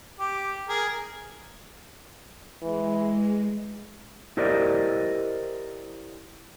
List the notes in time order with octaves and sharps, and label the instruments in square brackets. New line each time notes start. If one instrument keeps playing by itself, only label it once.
[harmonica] G4
G#4 A#4
[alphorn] E3 [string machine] G#3
[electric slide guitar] E4 G4 A#4 C5 D5 D#5